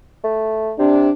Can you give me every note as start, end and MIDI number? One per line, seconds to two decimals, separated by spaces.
0.24 0.73 57
0.79 1.09 48
0.79 1.11 62